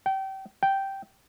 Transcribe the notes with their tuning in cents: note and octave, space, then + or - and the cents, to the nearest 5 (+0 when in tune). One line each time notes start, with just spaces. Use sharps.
G5 -30
G5 -10